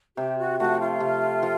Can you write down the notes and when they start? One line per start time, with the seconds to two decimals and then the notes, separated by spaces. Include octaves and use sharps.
0.17 C3 G4
0.38 F#4
0.59 F3 A3 F#4
0.80 F4
1.00 C3
1.43 F3